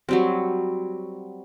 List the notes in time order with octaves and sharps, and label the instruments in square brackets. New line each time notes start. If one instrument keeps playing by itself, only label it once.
[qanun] F#3 G3 C4